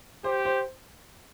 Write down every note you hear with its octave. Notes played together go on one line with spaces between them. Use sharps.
G4 C5
C5